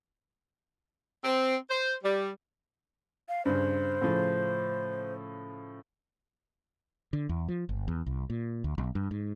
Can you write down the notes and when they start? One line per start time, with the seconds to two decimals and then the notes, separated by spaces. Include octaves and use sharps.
1.24 C4
1.70 C5
2.03 G3
3.29 F5
3.45 G2 C#3 C5
4.01 A2 C#3 F3
7.13 D3
7.29 E2
7.48 F3
7.69 G1
7.88 E2
8.06 C2
8.30 A#2
8.64 D2
8.78 B1
8.95 G2
9.11 G#2